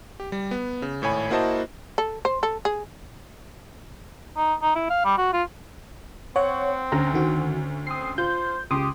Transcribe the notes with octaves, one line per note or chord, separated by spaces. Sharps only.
G4
G3
B3
C#3
G#1 A2 C#5 G#5 B5
A#3 E4 F#4 C5 D#5 A5
A4
C5
A4
G#4
D#4
D#4
E4
F5
G3
F#4
F4
C4 C#5 F#5
D2 C#4 A#5
D#3 F#4
C4 D#6 C7
F4 C5 G6
C#2 C#3 G4 C6 D6 D#6